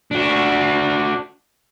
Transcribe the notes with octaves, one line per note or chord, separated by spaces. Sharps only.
D4 F#4